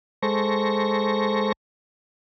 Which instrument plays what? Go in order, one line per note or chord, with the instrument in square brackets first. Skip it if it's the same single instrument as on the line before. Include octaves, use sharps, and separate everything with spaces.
[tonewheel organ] G#3 A4 C5 C#6 A#6